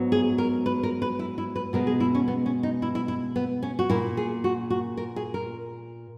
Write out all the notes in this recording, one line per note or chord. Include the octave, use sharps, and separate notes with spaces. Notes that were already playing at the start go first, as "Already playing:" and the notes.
Already playing: G#2 F#3 B3
G#4
A#4
B4
A#4
B4
E4
E4
B4
B2 G#3 B3 A#4
G#4
E4
C#4
B3
C#4
D#4
E4
E4
E4
B3
C#4
F#4
A#2 A#3 E4
G#4
F#4
F#4
A#4
G#4
A#4